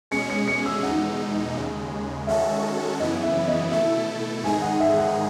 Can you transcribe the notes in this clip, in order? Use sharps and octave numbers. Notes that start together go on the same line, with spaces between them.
B2 G#3 C#4 G#4 C#7
C#7
C#7
E6
E2 B2 G#3 D#4 F#5
D#2 C#3 G#3
D#3 G#3 C#4 F#4 A4 E5
F#2 C#3 E3 B3 E4 D#5
E5
D#5
B2 A3 E4 A4 E5
G#2 D#3 G#3 D#4 G#4 G#5
F#5
E5
F#5